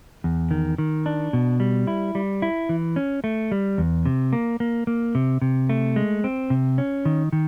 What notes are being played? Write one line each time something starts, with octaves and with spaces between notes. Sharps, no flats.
E2
D#3
D#3
D4
B2
G3
E4
G3
E4
E3
C#4
A3
G3
E2
C3
A#3
A#3
A#3
C3
C3
A3
G#3
C4
C3
C#4
D#3
D#3